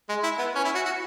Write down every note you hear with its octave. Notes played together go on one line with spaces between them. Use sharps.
G#3
E4
B3
C#4
E4
F#4
F#4